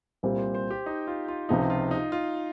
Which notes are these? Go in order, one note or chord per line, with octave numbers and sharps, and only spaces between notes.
C2 A#2 G3 C4 G4
C5
C5
G4
D#4
F4
F4
C#2 C3 F3 G#3 D#4
F4
D#4
F4